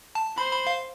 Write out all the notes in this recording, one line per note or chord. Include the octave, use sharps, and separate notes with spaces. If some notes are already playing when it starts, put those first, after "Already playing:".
A5
C5 B5
B5
F5